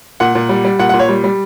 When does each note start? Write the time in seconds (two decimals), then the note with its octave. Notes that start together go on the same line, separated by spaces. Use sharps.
0.20 A#2 F#5
0.35 A#2
0.49 G3
0.65 G3
0.79 A#2 F#5
0.89 A#2 F#5
0.99 C#5
1.09 G3
1.24 G3